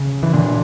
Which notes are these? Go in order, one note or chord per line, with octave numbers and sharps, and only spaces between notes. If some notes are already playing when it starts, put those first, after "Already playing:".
Already playing: C#3
E3
A#2 D3